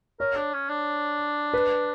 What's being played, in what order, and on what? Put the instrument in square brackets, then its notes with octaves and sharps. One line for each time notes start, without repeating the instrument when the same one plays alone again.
[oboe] A#4 [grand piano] C#5
[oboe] D4
C#4
D4
[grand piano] B4